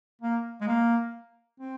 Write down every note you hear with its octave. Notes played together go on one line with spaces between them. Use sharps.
A#3
G#3
A#3
C4